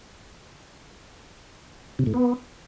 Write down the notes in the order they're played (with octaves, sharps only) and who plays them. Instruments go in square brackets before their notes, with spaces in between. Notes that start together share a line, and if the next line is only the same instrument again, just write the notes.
[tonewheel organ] C3
A2
B3